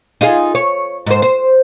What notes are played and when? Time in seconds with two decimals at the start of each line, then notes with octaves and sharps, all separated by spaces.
0.21 D#4 F4 G#4
0.55 C#5
1.06 G#2 C5
1.22 C5